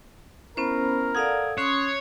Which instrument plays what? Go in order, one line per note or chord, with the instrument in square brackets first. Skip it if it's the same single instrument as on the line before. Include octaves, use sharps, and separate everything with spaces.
[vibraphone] B3 C#4 C5 [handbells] E4 [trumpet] A#4
[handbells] A4 D#6 G#6 [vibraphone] D5 F5 F#5
[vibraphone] C#4 C6 D#6 [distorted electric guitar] C#5 [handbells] F#6 C7